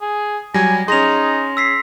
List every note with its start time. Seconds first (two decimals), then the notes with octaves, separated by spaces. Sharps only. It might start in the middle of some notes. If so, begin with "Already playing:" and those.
0.02 G#4
0.54 F#3 G3 G#5 A#6
0.88 C#4 D#4 G#4 C6 A#6 F7
1.57 E6 B6 C7